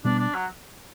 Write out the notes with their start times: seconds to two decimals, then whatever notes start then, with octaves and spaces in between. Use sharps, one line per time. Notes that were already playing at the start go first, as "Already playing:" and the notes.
0.05 B2 G3 B3 D4
0.19 D4
0.34 F#3